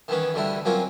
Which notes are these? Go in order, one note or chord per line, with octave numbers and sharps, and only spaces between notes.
D#3 E3 B3 C#4
D2 D3 G3 E4
F#3 A#3 C4 C#4 F4